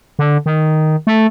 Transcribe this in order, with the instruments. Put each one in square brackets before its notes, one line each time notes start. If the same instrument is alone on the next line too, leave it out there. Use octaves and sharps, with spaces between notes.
[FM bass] D3
D#3
A3